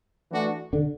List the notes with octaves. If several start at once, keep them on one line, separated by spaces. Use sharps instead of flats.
E3 A3 D4 F#4
D3